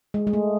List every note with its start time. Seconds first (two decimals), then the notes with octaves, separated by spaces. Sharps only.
0.14 G#3
0.27 G#3
0.33 A3